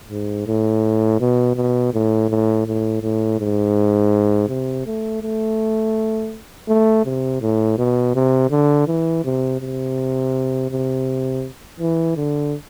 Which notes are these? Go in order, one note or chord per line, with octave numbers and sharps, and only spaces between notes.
G#2
A2
B2
B2
A2
A2
A2
A2
G#2
C3
A3
A3
A3
C3
A2
B2
C3
D3
E3
C3
C3
C3
E3
D3